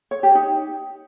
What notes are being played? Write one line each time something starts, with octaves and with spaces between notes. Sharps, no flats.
C#5
G4
D#4